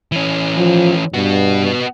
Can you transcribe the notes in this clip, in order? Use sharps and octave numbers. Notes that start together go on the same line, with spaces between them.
E3 C#4
F3
G2 B3 F#4